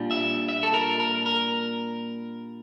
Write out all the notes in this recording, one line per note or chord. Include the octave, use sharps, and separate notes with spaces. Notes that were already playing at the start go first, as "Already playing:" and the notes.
Already playing: A#2 G3 A#3 D4 F4
E5
E5
A4
A#4
A#4
A#4